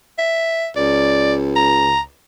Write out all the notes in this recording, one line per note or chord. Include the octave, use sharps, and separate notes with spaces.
E5
C#2 D5
A#5